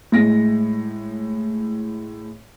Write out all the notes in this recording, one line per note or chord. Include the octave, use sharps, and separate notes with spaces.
A2 G#3 A#6